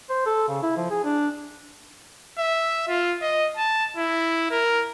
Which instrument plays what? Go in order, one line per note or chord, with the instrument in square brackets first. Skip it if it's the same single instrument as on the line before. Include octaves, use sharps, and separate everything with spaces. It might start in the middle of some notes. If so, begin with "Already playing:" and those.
[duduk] C5
A4
C#3
E4
F3
G#4
D4
[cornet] E5
F4
D#5
A5
E4
A#4